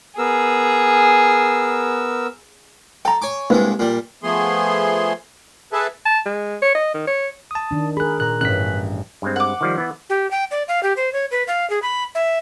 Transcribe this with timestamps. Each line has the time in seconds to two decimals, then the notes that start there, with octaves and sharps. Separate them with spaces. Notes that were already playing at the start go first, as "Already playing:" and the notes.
0.18 B3 G#4 A#4 E6
3.05 A4 G5 A#5
3.22 C#5 G#5 D6
3.50 C2 G2 G#3 A#3 B4
3.79 A#2 G3
4.23 F3 A3 B3 G#4 C6
5.73 G#4 A4 B4 E5 A5
6.06 A5
6.26 G#3
6.62 C#5
6.75 D#5
6.94 D#3
7.07 C#5
7.51 A5 D#6
7.71 D#3 D4
7.97 G#4 A#4 B5 F#6
8.20 A#2 A#5 F#6
8.41 A1 G2 C#4 F#6 B6
9.22 G2 G#3 C4
9.36 F#5 D6
9.61 D#3 F3 G3
9.78 E3 B3
10.10 G4
10.31 G5
10.51 D5
10.68 F5
10.83 G4
10.97 C5
11.13 C#5
11.31 B4
11.48 F5
11.70 G#4
11.82 B5
12.15 E5